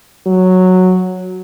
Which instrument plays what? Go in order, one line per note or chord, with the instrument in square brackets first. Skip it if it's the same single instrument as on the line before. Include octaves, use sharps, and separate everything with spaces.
[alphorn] F#3